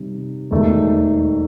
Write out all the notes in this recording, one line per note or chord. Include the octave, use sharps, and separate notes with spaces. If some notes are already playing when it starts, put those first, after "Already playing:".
Already playing: C3 D#3 G3
E1 D#2 D#3 A3